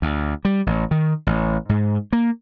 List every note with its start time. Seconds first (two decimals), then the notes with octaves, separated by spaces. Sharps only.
0.02 D2
0.45 G3
0.66 A1
0.91 D#3
1.27 A1
1.69 G#2
2.13 A#3